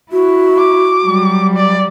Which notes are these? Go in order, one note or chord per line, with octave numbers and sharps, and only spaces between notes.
E4 F#4
D6
F#3 G3
D5